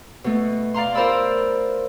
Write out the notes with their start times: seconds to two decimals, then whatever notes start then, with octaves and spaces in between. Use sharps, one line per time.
0.24 B2 A3
0.74 D5 F5 A#5 C6
0.95 F4 A#4 C5 D5 B5 E6